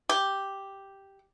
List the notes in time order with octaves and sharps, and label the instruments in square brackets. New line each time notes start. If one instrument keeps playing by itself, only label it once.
[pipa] G4